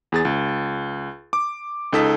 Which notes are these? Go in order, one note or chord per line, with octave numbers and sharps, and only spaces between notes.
E2 G#4 A6
C#2
D6
C#2 D#4 A4 D#6 B6